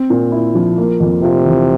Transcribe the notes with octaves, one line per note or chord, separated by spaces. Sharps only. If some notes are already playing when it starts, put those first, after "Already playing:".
Already playing: C4
A#2
E4
F3
A#3
F2
C3 F4
E3